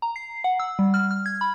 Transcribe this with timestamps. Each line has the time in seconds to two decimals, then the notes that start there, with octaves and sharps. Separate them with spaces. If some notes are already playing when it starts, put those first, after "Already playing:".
0.02 A#5
0.16 C7
0.44 F#5
0.60 E6
0.79 G3
0.94 F6
1.11 F6
1.26 G#6
1.41 B5